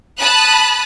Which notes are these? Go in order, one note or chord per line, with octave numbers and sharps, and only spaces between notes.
A5 B5 D#6 F#6